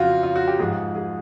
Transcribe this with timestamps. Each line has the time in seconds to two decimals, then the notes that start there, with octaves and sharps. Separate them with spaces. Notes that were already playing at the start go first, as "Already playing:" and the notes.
Already playing: F2 C#3 F#3 F4 F#4
0.23 F4
0.36 F#4
0.48 G4
0.59 G#2 F3 G#4
0.95 G#4